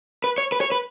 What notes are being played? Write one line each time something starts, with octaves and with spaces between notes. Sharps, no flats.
B4
C#5
B4
C#5
B4